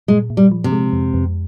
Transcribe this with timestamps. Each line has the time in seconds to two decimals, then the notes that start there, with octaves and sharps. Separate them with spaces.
0.08 A#2 G#3
0.30 A#2
0.37 G3
0.51 F3
0.64 C3
0.72 G#3
0.93 F2
1.14 F2